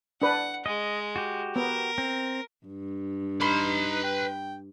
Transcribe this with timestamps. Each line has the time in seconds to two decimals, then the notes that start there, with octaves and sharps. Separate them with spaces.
0.22 D4 B4 F#5
0.66 G#3 D#5
1.16 F#4 G4
1.56 B3 A#4
1.98 C4
2.67 G2
3.41 D#4 B4 B5 C6 F6
4.04 G5